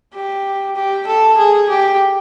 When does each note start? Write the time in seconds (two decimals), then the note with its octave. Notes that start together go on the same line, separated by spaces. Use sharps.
0.14 G4
0.75 G4
1.06 A4
1.37 G#4
1.69 G4